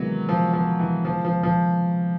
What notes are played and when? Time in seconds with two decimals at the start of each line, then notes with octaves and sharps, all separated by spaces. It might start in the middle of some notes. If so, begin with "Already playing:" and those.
Already playing: C3 D#3 E3 F#3 G#3 B3
0.29 F3
0.53 F3
0.79 E3
1.05 F3
1.25 F3
1.43 F3